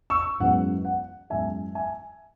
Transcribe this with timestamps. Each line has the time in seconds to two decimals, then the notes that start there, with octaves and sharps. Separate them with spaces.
0.10 C#6 E6
0.40 F#2 E3 G#3 B3 F#5
0.85 F#5
1.30 F#2 E3 G#3 B3 E5 G#5
1.75 E5 G#5